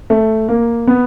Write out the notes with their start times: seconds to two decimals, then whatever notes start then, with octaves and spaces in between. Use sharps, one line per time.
0.10 A3
0.48 A#3
0.87 B3